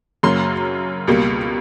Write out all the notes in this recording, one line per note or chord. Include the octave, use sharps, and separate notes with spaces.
F#2 C#3 F#3 A#3 C6
C#2 B2 G3 A#3